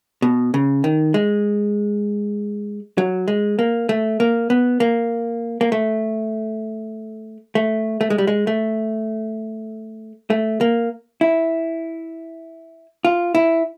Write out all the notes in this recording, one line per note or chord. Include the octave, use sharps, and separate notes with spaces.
B2
C#3
D#3
G#3
F#3
G#3
A#3
A3
A#3
B3
A#3
A#3
A3
A3
A3
G#3
G3
G#3
A3
A3
A#3
E4
F4
E4